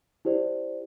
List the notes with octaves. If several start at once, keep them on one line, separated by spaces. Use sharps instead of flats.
E4 G4 C5 D5